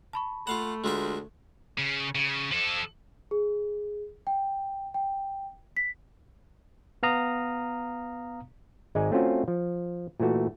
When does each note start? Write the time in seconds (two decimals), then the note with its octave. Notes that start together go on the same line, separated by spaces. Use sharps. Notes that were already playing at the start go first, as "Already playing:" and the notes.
0.13 A5 B5 C#6
0.47 A3 F4 F5 F#5 B5
0.84 D2 G#3 F4 E5
1.78 C#3
2.15 C#3
2.51 F3 A4
3.31 G#4
4.27 G5
4.94 G5
5.77 B6
7.03 B3 F5 A#5 D#6
8.95 G#1 G#3 D#4 D5 G#5
9.12 A3 C4 C#4 F4 F#4
9.48 F3
10.20 A#2 E3 A3 F#4